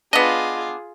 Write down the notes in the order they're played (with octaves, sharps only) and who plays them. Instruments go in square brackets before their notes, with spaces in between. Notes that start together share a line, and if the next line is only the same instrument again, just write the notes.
[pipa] B3 D4 [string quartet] F4 G#4 [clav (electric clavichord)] D#5